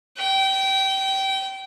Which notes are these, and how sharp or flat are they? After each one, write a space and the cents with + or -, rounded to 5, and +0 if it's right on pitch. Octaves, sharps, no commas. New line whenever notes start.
G5 -25